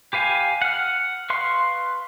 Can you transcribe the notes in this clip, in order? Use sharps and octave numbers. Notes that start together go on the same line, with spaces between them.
G4 B4 F5 G#5
F#5 F6
B4 F5 C6 C#6